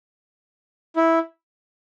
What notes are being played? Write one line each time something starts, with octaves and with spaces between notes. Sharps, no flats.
E4